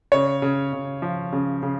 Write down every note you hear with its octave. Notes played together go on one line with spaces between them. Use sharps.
C#3 C#5
C#3
C#3
F3
C#3
C#3